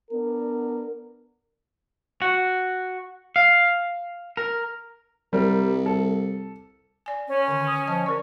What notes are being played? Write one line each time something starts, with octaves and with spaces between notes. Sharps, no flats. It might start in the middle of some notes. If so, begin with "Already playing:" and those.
B3 D4 A#4
F#4
F5
A#4
C2 G3 A#4
A4
D5 G#5
C#4
D3 D#3
D#6
F3 D#5 A5
C#4 A#4 D5 C#6